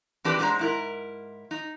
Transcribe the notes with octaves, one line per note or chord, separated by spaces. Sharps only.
E3 C4 D4 G4 A4 B4
G#2 F#3 G#3 D4 C5 A#5
G#2 E4 A#4
D#4